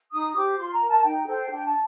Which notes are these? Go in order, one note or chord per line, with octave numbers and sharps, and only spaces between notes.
D#4 D#6
G4 C5 D6
F4 C6
A#5
A#4
A5
D#4 G5
A4 C5 G5
D4 G5
A5